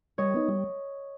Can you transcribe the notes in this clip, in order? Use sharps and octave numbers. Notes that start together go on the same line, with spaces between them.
G3 C#5 D#5
B3 D#4
G3